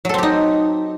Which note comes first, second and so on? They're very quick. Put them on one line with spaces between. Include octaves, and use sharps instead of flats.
F#3 A4 C4 G4 D#4